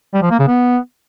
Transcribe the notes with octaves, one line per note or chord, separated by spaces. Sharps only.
G3
F3
A#3
C#3
B3